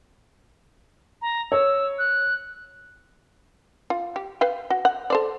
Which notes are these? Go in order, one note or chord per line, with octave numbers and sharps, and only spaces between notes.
A#5
C#5 E6
F#6
F4
G4
B4 F5 G5
F#4
F#5
A4 C5 D5